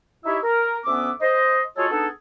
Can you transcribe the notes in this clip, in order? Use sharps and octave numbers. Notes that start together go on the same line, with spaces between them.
D#4 E4 G4 C#5 E5
A#4
D2 B3 C#4 E5 D6
C5 D#5
G#3 F4 F#4 G#4 A4 C#5
B3 D4 D#4 G#4 A4